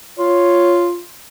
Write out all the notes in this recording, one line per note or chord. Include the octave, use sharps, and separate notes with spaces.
F4 C#5